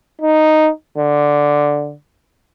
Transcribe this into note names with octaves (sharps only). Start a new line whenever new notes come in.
D#4
D3